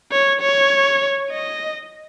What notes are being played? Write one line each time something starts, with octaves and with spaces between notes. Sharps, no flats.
C#5
C#5
D#5